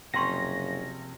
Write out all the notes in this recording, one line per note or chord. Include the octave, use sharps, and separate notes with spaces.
F#1 C3 F3 C#4 G5 C6 C#6 A#6